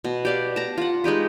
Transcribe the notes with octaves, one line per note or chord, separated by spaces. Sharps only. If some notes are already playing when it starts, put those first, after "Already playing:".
B2
G4 D5 F5
A5 A#5
F4 F#5
G#3 D#4 G4 B4